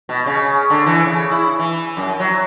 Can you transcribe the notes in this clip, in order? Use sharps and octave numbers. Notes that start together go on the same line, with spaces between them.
B2
C#3
D3
E3
C#3
E4
E3
F#2
F#3